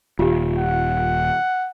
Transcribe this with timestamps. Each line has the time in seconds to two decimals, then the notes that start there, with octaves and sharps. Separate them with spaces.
0.19 D#1 F4 G4
0.58 F#5